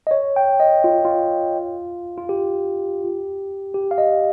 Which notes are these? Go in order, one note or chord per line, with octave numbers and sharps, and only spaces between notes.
D#5
C#5
G5
D#5
F4
F4
F4
G4
G4
F5
D#5